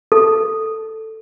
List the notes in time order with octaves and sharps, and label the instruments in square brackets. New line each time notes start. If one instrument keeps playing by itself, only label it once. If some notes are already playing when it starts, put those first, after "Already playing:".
[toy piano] A4